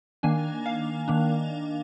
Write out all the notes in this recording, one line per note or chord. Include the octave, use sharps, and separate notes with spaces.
D#3 A#3 D4 G#5
F5
D#3 A#3 D4